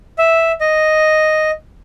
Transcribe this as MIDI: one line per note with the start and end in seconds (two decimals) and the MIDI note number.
0.18 0.52 76
0.61 1.51 75